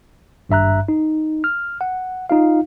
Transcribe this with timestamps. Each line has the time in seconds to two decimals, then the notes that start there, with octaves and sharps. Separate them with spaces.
0.49 G#1 G2 E5 A#5 F#6
0.88 D#4
1.44 F6
1.81 F#5
2.30 D#4 F4 F5